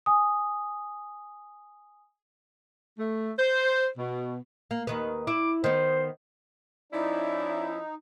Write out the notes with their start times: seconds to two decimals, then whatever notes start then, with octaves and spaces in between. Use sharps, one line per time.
0.06 G#5 D#6
2.99 A3
3.39 C5
3.98 B2
4.71 A#3
4.87 D#2 D#3 B4
5.27 E4 D6
5.64 D#3 B3 C5
6.93 F3 C#4 D#4 E4 D5